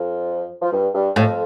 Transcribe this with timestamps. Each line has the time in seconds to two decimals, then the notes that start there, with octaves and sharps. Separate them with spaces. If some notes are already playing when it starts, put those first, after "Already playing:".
Already playing: F2 F3
0.62 F3
0.72 G2 G3
0.94 G2 G3
1.16 F2 A2 F3